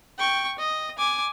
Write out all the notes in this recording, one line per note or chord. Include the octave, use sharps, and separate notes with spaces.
G5 C#6
D#5
G#5 D6